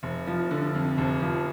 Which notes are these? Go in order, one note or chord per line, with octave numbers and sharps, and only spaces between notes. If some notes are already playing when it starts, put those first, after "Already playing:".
F1
F3
D3
F2
F1
F3